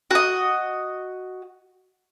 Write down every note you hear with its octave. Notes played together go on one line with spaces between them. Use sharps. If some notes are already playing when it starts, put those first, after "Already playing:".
F#4 D#5